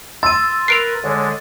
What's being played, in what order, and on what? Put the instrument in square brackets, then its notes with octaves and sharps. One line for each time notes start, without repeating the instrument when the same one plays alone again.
[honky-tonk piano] C6 E6 [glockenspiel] A6 D#7
[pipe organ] A#4 B4 [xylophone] C7 D7 F7
[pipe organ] D3 G#3 [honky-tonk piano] C#5